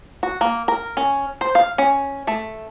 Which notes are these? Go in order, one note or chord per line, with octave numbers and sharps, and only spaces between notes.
F#4
A#3
A#4
C#4
C5
F5
C#4
A3